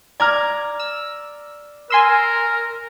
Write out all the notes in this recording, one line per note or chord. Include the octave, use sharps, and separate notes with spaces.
D5 A#5 F6 G#6
E6
A#4 G#5 C6 E6